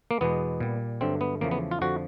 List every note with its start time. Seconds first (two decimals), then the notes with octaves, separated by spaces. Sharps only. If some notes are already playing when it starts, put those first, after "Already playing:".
0.11 A#3
0.21 E2 B2 G#3 B3
0.60 A#2 G3
1.01 G2 D3 F#3 A3 C4
1.21 B3
1.41 E2 C#3 F3 A3 A#3
1.51 B3
1.71 F4
1.81 F2 D3 F3 F#4